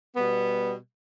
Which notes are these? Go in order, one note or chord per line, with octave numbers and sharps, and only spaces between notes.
B2 G3 B3